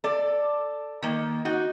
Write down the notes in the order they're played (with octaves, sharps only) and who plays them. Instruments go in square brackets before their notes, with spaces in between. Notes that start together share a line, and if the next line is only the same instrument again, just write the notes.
[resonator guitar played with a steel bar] A4 D5
D#3 A#3
D#4 F#4